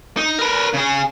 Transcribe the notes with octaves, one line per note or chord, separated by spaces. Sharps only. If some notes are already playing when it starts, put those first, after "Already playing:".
D#4
A#4 B4
C#3 G#4